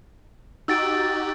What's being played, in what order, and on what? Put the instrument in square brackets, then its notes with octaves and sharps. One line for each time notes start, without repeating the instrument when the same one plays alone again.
[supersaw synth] D#4 F#4 G4 [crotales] E6 A6 D7